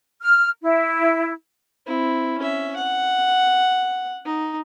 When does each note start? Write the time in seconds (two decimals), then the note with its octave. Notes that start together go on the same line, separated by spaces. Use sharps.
0.22 F6
0.63 E4
1.86 C4 E4
2.38 C#4 E5
2.76 F#5
4.25 D#4